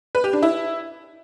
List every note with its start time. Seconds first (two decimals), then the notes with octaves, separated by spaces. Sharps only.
0.15 B4
0.24 G4
0.33 D4
0.43 E4